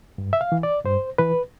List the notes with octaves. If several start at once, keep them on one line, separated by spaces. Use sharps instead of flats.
G2
E5
F5
E3
D5
G2 C5
E3 B4